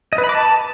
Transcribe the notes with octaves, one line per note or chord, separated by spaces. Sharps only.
D#5
B4
B5
D6
A5